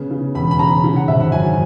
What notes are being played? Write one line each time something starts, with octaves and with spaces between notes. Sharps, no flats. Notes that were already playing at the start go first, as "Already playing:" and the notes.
Already playing: C#3 B3
C#3
E1 B5
B5
C#3 A#5
C#3
F#5
G#1 E5
F#5
F#2 G#5